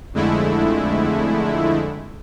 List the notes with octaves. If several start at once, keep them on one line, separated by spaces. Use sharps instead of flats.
F2 D3 G#3 A3 E4